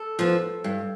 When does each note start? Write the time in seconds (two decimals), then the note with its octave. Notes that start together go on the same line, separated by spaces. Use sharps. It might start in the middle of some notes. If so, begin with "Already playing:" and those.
Already playing: A4
0.19 F3 B3
0.64 G2